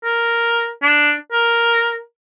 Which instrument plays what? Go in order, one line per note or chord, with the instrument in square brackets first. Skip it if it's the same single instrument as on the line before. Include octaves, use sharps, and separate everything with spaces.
[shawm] A#4
D4
A#4